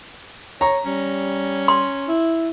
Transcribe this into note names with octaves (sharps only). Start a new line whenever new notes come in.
C#5 A#5
G3 C#4
C6
E4